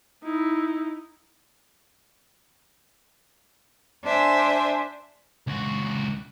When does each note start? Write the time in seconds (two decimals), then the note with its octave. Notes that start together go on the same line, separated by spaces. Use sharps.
0.24 D#4 E4
4.04 D4 C5 E5 G#5
5.47 C#2 F#4